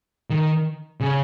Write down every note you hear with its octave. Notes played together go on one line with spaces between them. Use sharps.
D#3
C#3